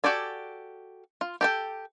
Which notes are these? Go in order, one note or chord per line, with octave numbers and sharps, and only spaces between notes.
F#4 G4 A4 D5 G#5
F4
G4 A4 G5